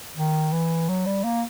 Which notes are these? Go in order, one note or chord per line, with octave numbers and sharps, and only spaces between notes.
D#3
E3
F#3
G3
A#3